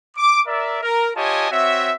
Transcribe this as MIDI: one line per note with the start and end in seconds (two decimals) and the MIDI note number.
0.16 0.40 86
0.47 0.78 70
0.47 0.78 74
0.47 0.78 76
0.82 1.09 70
1.16 1.49 65
1.16 1.49 67
1.16 1.49 73
1.16 1.49 75
1.16 1.49 80
1.16 1.49 81
1.51 1.92 60
1.51 1.92 66
1.51 1.92 73
1.51 1.92 76